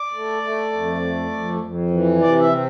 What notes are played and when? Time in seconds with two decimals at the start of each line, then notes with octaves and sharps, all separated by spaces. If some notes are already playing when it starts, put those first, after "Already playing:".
Already playing: D5
0.13 A3
0.43 A3
0.73 F2
1.02 A3
1.31 F2
1.61 F2
1.91 E3
2.20 C3 D5
2.39 E5
2.50 C4